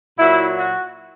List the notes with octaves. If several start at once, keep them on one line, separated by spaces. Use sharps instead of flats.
A#2 F#3 E4
F#4